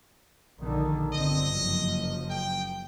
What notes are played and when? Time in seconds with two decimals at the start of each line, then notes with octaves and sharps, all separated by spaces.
0.62 A#1 D3 D#3
1.13 G1 D3 C4 D#5
1.49 F#1 F3
2.30 G5